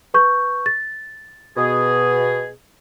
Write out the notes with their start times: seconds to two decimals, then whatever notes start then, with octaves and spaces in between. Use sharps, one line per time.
0.14 B4 C#6 G6
0.66 A6
1.57 B2 G#4